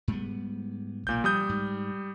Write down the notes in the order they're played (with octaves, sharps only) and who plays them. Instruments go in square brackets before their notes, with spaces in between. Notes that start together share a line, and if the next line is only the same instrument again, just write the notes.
[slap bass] G#2 G3 B3
[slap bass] B1 F3 A#3 [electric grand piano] A#2 G6
[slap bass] F3 [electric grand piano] G3 D#6 G6
[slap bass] G#2